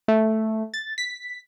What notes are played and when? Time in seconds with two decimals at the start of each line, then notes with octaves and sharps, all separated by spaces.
0.08 A3
0.74 A6
0.98 B6